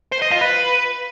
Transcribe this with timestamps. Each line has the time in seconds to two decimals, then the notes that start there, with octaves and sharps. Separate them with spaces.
0.12 C5
0.22 D#5
0.31 F4
0.41 B4